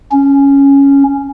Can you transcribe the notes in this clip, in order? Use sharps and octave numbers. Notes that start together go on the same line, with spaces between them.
C#4